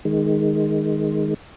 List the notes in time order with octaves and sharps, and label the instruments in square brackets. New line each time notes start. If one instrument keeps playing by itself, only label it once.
[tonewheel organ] D#3 G#3